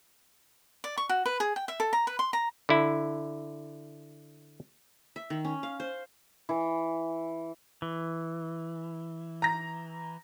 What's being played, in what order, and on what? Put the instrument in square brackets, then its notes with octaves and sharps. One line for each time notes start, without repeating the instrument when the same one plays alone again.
[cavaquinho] D5
C#6
F#4
B4
G#4
G5
E5
A4
A#5
B4
C6
A#5
[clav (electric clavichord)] D3 E4
[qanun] E5
D#3
C#4
F5
C5
[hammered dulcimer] E3
[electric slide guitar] E3
[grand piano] A#5 A#6